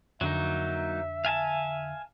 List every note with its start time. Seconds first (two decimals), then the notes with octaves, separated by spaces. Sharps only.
0.21 F2 D3 F#3 A#3 D#4 E5
1.25 F5 G#5 A5